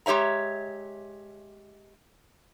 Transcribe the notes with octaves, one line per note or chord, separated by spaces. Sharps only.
G#3 G4 C#5 E5 A#5